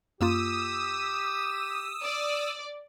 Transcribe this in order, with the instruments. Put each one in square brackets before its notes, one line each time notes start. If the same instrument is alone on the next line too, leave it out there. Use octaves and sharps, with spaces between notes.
[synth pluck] F#2 A#3 F4 [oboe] G4 [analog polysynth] D#6 E6
[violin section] D5